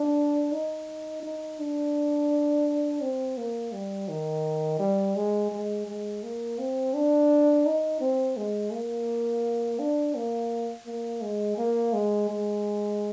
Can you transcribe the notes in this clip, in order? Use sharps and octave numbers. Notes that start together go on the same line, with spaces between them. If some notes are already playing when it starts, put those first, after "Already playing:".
Already playing: D4
D#4
D#4
D4
C4
A#3
G3
D#3
G3
G#3
G#3
G#3
A#3
C4
D4
D#4
C4
G#3
A#3
D4
A#3
A#3
G#3
A#3
G#3
G#3